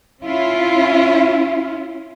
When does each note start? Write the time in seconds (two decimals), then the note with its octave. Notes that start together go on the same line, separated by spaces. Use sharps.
0.22 C#4 E4 F4